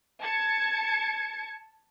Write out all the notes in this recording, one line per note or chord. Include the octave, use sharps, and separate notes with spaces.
A5 G#6 C#7